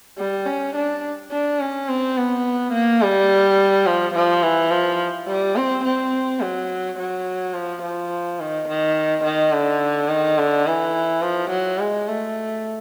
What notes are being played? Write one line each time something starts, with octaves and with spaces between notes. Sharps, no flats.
G3
C#4
D4
D4
C#4
C4
B3
A#3
G3
F3
F3
E3
F3
G3
C4
C4
F#3
F#3
F3
F3
D#3
D#3
D#3
D3
D#3
D3
E3
F3
F#3
G#3
A3